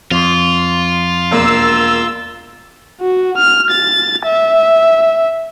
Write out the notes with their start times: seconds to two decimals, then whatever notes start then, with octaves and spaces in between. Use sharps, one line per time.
0.11 F2 F4
1.31 E1 A#3 E6
3.01 F#4
3.37 F6
3.71 A6
4.26 E5